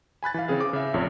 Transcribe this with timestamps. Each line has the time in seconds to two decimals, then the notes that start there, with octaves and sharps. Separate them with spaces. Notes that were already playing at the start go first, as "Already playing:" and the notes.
0.23 G#5 B5 F#6 A6
0.34 E3 F5
0.48 C#3 E3 C4 G#4 F5
0.61 D6
0.73 C#3 E5
0.94 A1 F2 C#3 C#5